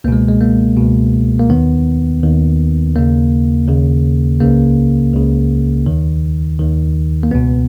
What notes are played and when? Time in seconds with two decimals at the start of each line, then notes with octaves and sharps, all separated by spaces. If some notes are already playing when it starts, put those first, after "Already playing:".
0.04 C#2 A#3
0.08 B2 G#3
0.28 G#3
0.41 A#3
0.77 C#2 B2
1.39 A#3
1.50 D#2 D#3 B3
2.23 D#2 D#3
2.95 D#2 C#3 A#3
3.68 D#2 C#3
4.40 C#2 C#3 A#3
5.14 C#2 C#3
5.86 D#2 D#3
6.59 D#2 D#3
7.23 A#3
7.31 C#2 B2 B3